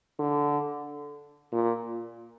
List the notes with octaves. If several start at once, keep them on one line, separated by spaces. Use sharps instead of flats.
D3
A#2